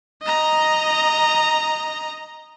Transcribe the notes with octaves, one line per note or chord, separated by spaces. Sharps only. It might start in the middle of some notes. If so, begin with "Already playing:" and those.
D#5 A#5